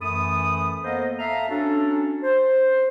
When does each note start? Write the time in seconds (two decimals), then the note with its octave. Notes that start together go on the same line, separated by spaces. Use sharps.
0.01 F#2 E3 A3 A4 B5 D#6
0.84 A#3 B3 A4 A#4 C5 D#5
1.19 A4 E5 F5 A#5
1.49 C#4 D4 F#4 A4
2.23 C5